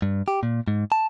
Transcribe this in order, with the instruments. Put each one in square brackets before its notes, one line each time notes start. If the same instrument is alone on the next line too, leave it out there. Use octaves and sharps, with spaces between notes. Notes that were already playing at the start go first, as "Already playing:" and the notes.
[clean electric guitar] G2
G4
A#2
G#2
A5